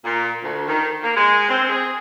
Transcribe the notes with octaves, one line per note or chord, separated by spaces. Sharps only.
A#2
D2
D#3
A#3
G#3
C4
G#4